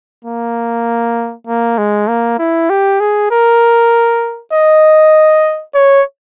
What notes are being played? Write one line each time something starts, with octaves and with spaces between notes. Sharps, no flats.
A#3
A#3
G#3
A#3
E4
G4
G#4
A#4
D#5
C#5